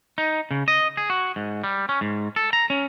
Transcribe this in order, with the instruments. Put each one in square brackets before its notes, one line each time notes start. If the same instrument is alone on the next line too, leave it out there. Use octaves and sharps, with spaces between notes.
[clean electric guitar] D#4
C#3
D#5
G#4
F#4
G#2
G3
C#4
G#2
A4
A#5
C#4